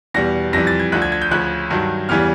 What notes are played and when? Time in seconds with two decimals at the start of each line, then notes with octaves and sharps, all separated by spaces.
0.14 E2 B2 G3 A#6
0.53 F2 C3 E3 G3 A#6
0.67 A6
0.80 G#6
0.92 D2 D3 F3 F#6
1.02 G#6
1.12 G#6
1.22 G6
1.31 D2 C#3 F3 F#6
1.70 G2 D#3 F#3
2.09 E2 C#3 E3 G3 F6